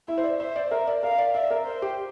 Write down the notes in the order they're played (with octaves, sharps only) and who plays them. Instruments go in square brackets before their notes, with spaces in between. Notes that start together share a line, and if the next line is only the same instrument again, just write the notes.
[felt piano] E4 [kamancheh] E5
[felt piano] C5
D5
[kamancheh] C5 [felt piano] E5
[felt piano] D5
[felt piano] A#4 [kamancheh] E5
[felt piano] D5
[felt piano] A#4 [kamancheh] F5
[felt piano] D5
[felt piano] D5 [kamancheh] E5
[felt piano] A#4
[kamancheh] C5
[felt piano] G4